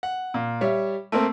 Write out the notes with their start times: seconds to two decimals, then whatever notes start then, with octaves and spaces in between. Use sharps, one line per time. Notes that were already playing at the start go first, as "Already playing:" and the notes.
0.03 F#5
0.34 A#2
0.61 G3 C#5 E5
1.12 A3 A#3 C4